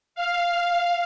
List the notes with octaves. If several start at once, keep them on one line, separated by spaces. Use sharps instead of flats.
F5